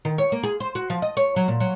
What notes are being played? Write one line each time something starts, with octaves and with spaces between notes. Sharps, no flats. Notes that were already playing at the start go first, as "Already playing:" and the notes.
D#3
C#5
A#3
G#4
C5
F#4
F3
D#5
C#5
F#3
A#2
F#3